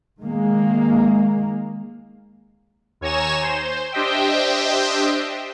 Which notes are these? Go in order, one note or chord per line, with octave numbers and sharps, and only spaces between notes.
D#3 G#3 A#3
D#2 C#5 G#5 A#5 E7
C5
D4 G4 C5 D#5 E5 G5